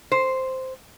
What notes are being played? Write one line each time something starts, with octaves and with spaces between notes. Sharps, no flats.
C5